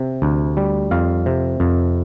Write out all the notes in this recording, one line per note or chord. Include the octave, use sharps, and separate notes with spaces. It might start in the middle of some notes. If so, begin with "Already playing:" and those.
Already playing: C3
D2
G3
F2 F5
C3
F2